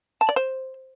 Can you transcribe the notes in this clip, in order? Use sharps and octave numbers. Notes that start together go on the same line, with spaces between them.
A5
D5
C5